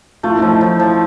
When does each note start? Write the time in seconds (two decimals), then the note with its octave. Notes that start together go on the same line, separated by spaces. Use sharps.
0.23 A3 F4
0.31 E4
0.39 D#4
0.42 F3 E4
0.61 F3
0.80 F3